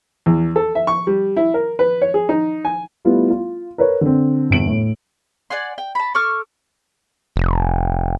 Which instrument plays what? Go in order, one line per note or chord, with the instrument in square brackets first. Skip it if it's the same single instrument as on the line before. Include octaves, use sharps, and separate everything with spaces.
[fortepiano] E2
A4
E5
C#6
G3
E4
A#4
B4
C#5
G#4
D#4
G#5
[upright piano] G3 A3 B3 E4 F4
F4
A#4 B4 C#5
D3 C4
G1 E2 D7 F#7
A2
[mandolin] D5 F#5 G#5 C6
G5
A5 B5
A4 C#6 D6 F6
[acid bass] F1